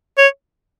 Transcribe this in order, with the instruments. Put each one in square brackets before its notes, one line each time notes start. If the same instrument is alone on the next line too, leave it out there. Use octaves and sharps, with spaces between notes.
[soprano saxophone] C#5